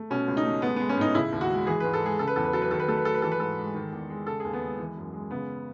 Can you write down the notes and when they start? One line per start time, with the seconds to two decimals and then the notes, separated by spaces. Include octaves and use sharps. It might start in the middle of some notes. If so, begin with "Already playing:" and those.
Already playing: A3
0.10 B2 C#4
0.28 C#2
0.37 D#4
0.45 A3
0.62 G#3 B3
0.76 G#3 B3
0.89 C#4
0.97 A2 D#4
1.15 C#3 E4
1.33 D#2
1.41 F#4
1.50 G#3
1.67 E3 G#4
1.80 G#2 B4
1.94 A4
2.02 G#3 G#4
2.19 C#3 A4
2.28 B4
2.36 E2 A4
2.44 B4
2.53 F#3 A4
2.62 B4
2.71 D#3 A4
2.80 B4
2.88 A3 A4
2.97 B4
3.05 F#3 A4
3.14 B4
3.22 E3 A4
3.32 B4
3.40 G#2 A4
3.58 G#3
3.75 D#3
3.92 E2
4.10 G#3
4.27 C#3 A4
4.40 G#4
4.45 D#2
4.53 B3
4.61 G#3
4.79 E3
4.97 F#2
5.13 G#3
5.31 C#3 B3